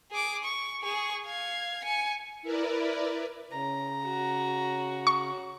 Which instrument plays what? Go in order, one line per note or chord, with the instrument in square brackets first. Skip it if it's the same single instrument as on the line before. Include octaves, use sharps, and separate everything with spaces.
[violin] G#4 D6
C#6
G#4 C#6
F5 G#6
G#5 C#7
[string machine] E4 A#4 B4 D5
[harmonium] C#3 [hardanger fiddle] A#5
[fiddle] F#4
[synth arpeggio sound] C#6